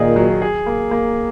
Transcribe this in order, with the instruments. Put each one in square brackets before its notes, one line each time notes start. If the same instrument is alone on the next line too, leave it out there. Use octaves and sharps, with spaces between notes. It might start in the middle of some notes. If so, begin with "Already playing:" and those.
Already playing: [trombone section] A#2 [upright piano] D#3 G#4 D#5
[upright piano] F#3
G#4
A#3
A#3